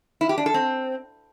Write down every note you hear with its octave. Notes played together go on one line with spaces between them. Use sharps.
E4
G4
D4
A4
C4